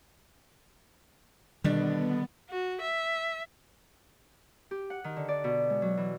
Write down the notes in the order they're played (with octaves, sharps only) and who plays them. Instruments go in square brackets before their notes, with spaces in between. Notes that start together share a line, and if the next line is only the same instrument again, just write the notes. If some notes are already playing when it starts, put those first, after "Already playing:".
[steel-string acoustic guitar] B2 D3 D4 [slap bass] D#3 G3 [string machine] B3
[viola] F#4
E5
[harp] G4
F#5
D#3
D3
D5
B2
G#3
F#3
E3